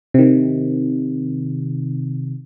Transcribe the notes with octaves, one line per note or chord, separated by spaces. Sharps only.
C3 D#3